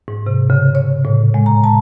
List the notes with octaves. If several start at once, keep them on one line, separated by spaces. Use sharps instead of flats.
G#2
C3
C#3
C#5
A2
G#3
A#5
A5